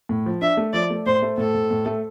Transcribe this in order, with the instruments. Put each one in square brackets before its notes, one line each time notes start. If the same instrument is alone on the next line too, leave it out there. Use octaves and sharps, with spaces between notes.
[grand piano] A2
F3
[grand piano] D4 [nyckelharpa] E5
[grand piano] A3
[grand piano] F3 [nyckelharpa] D5
[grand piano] A3
[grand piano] A2 [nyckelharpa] C5
[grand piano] A3
[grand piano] A2 [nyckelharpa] A4
[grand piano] A2
A2
A3